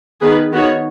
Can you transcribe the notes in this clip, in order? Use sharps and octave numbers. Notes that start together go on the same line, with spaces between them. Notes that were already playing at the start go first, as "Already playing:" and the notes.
D#3 B3 G#4 B4
D#3 B3 F#4 C#5